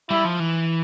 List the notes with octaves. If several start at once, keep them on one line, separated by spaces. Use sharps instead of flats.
G3 E4
F3
E3